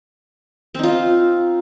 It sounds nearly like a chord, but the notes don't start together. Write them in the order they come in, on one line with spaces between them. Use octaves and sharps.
C4 D#4 F4